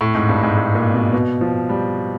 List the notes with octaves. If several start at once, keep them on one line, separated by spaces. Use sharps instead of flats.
A2
G#2
G2
G#2
A2
A#2
B2
B2
F3
G3